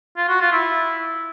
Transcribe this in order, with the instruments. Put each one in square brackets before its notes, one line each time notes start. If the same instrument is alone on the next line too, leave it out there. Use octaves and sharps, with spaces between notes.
[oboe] F4
F#4
F4
E4